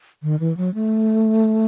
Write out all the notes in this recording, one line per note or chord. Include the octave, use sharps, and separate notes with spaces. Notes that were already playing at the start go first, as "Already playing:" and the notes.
D#3
E3
F#3
A3